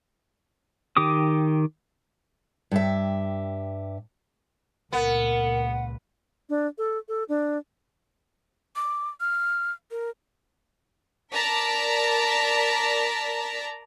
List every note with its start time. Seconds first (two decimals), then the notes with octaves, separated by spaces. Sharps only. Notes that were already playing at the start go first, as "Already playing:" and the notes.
0.97 D#3 G4 D6 D#6
2.71 G2 G4 E5
4.93 C#2 A#2 B3 A#4 F#5
6.49 D4
6.78 A4
7.08 A4
7.29 D4
8.76 D6
9.20 F6
9.91 A#4
11.33 A#4 D5 A5 A#5 B6